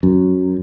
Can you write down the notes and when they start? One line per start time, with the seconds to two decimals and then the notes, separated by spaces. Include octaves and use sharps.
0.03 F#2